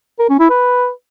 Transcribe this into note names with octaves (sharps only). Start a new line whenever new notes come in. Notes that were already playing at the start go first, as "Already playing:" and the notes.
A#4
C#4
E4
B4